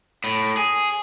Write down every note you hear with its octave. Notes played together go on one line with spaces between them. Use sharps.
A2
G#4